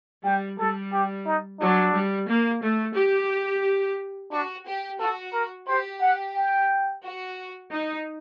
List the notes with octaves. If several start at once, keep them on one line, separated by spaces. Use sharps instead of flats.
G3 G5
G3 A4
G4
D#4
F#3 D4
G3
A#3
A3
G4
D4 F#4
G4
F#4 A4
A#4
G4 C5
F#5
G5
F#4
D#4